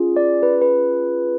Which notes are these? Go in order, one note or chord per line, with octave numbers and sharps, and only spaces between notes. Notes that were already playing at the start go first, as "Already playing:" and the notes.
Already playing: C#4 F4 G#4
D5
B4
B4